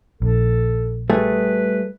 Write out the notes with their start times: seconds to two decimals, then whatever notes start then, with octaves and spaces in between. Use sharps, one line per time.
0.22 A#1 A4
1.10 G3 A3 G#4 B4